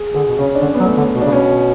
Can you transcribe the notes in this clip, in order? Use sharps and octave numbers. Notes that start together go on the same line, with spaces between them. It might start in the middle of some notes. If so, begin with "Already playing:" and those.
Already playing: G#4
D3 G#4
B2
C#3 C#4
D4
D3 C#4
B3
F#3
A3
D3
B2
C#3 D4
B2 C#4